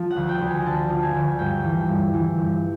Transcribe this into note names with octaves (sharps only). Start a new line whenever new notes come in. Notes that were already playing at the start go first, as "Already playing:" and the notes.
Already playing: F3
F#5
D2
G5
D2
G#5
D3 A5
F3
G#5
D2
G2 G5
E3
G2
E3
G2